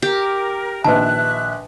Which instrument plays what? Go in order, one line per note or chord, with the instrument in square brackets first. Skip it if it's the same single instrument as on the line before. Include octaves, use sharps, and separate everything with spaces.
[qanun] G4 [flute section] A#4
[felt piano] A#1 D#3 [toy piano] B4 A5 [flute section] E5 F#6